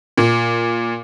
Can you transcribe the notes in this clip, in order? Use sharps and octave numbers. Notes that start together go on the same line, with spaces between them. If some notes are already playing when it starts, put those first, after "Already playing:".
A#2